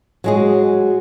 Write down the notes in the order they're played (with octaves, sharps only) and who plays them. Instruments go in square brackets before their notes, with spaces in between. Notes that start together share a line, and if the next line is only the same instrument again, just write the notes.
[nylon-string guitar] F#3 G#3 G#4